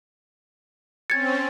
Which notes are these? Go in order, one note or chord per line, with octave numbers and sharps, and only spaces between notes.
C4 C#4 G#6 A6 C#7